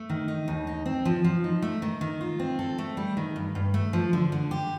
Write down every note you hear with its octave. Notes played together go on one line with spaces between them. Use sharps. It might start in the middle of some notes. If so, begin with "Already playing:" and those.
Already playing: A3
D#3
D#4
D#2
D#4
C4
F3
F3
D#4
A3
D#3
D#3
F4
C4
A4
A3
G3
D#3
G2
G2
A3
F3
D3
D3
G4